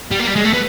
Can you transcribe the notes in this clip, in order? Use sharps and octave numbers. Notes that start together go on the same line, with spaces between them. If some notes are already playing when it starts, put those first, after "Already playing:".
G3
A#3
G3
G#3
A3
B3